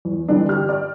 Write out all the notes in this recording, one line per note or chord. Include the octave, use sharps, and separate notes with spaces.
E2
D3 E3 G3 D4
G4 F6
D5